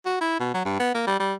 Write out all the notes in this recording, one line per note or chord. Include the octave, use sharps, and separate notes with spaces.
F#4
E4
B2
F#3
G2
B3
A#3
G3
G3